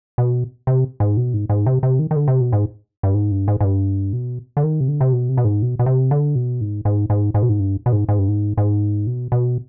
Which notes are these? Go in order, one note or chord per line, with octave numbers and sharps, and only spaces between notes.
B2
C3
G#2
B2
G#2
G#2
C3
C3
D#3
D#3
D3
C3
B2
G#2
G2
G#2
G2
G#2
G#2
G2
B2
D3
D#3
C3
D3
C3
B2
C3
B2
G#2
B2
B2
C3
D3
B2
G#2
G#2
G#2
G#2
B2
G#2
G2
B2
G#2
G#2
G2
G#2
G#2
B2
B2